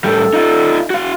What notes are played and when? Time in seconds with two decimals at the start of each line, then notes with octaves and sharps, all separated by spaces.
0.04 A2 G3 A4
0.34 D#4 F4
0.90 F#4 F5